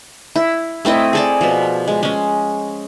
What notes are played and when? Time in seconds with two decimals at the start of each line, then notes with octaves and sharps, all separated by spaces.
0.36 E4
0.85 A3 C4 E4 D#5
1.13 G#4 A4 D5
1.41 B2 F3
1.88 G#3
2.03 G#3 C#4